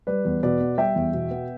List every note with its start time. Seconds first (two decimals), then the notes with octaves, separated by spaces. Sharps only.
0.07 G3 B4 D5
0.25 E2
0.43 B2 B4 D5
0.61 B3
0.78 G3 E5 G5
0.96 E2
1.13 B2
1.31 B3